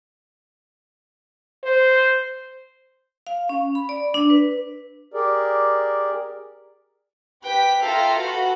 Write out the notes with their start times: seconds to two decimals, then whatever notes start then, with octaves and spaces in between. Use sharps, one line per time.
1.64 C5
3.27 F5
3.49 C#4
3.75 B5
3.89 D5
4.14 D4
4.30 B4
5.14 G4 G#4 A#4 D5
7.44 G4 B4 G5 B6
7.81 F4 A4 E5 F5 G5 A#5
8.19 F#4 A4 B4